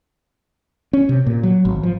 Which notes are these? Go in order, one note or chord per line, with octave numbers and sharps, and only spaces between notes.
C#4
C3
A#2
F#3
G#1
F3